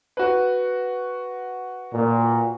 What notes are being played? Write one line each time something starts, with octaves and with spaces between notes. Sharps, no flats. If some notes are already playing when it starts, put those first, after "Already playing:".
F#4 B4
A#2